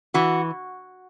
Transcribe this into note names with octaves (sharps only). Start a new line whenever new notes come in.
E3 F#4